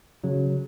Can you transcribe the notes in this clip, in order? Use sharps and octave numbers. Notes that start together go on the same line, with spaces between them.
C#3 F#3